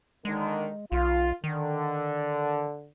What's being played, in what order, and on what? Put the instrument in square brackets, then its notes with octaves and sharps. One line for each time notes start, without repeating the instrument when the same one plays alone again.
[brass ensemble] D#2 D3 D#3 [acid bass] G#3
[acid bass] B1 [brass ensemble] F4
[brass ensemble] D3 [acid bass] D#3